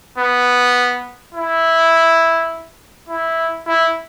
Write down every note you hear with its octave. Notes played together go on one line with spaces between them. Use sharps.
B3
E4
E4
E4